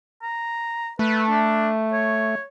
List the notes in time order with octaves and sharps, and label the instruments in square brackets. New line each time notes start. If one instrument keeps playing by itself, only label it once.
[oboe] A#5
[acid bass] A3 [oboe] B4
[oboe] D4
C#5